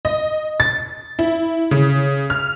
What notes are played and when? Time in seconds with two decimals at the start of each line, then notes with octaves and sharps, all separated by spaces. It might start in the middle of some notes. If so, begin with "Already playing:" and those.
0.05 D#5
0.60 A6
1.19 E4
1.71 C#3
2.30 F6